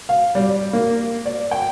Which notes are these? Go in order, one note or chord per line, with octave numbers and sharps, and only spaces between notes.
F5
G3
A#3
D5
G5